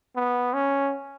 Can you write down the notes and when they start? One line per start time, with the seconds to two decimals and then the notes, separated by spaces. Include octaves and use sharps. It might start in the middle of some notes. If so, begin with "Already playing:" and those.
0.16 B3
0.54 C#4